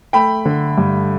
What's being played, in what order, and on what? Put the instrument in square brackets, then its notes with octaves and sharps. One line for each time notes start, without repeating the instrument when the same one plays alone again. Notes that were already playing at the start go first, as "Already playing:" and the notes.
[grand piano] A3 G5 B5
D3
G2